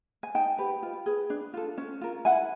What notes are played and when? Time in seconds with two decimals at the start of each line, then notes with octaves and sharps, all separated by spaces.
0.23 G#5
0.35 D#4 G5 A5
0.58 G4 B4
0.83 F4
1.06 G#4 B4
1.30 D4
1.54 F4 A4
1.78 C#4
2.01 F4 A#4
2.25 E4 F#5 G#5